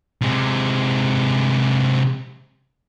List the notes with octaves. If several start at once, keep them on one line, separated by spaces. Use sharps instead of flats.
C3 G#3